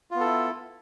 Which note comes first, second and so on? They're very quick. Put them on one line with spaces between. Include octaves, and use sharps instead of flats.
F4 B3 A4 E4